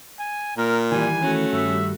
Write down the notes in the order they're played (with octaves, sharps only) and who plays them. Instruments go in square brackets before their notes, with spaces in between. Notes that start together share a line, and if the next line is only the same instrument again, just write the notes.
[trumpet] G#5
[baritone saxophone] A#2 [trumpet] A#4
[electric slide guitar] D#3 E3 [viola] G3 [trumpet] G#5
[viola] A3 F#4 [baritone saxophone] C#4
[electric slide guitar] G2 D#3 G3 [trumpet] E5